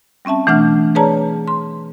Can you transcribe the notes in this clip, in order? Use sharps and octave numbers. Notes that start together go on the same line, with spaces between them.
G3 C4 C#4 E5 A5
B2 E3 A3 D4 F#5 F6
G#4 B4 C#5 D5 A5 A#5
C6